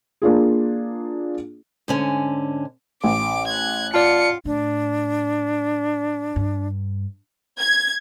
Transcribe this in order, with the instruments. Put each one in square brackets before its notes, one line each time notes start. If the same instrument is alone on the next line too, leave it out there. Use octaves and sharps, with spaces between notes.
[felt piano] A#3 D4 F4 G#4
[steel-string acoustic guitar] G#2 D3 C#4
[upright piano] A1 [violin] D6
[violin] F#6 G#6
[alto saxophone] F4 [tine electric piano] D5 A5 [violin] C#7
[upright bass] A2 [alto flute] D4
[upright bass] G2
[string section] G#6